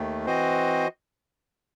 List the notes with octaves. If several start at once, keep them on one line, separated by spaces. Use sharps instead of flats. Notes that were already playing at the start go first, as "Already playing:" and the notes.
Already playing: D#2 D#3 A3
E3 C4 F#4 C5 D#5